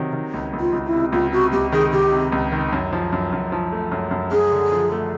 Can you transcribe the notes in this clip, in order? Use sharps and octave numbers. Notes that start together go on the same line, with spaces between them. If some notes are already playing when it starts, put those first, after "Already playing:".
Already playing: C3 D#3 F#3
D#3
C#2
C#2
F4
C#2
E4
C3
C#2 F4
C3 F#4
C#2 G4
D#3 G#4
D#3 G4
C3
C#2
D#3
F#2
F3
F#2
F#2
F3
A3
F#2
F#2
F#2 G#4
D3
F3
A3